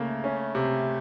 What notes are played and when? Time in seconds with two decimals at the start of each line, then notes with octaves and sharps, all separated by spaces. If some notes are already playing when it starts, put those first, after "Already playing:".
Already playing: C#3 A3 A#3
0.24 C#4
0.55 C3